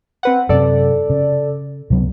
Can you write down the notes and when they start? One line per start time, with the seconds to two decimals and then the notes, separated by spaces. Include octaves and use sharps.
0.23 C4 B4 F#5
0.49 F#2 C3 A4 D5
1.10 C#3
1.90 C#2 C3 F#3 B3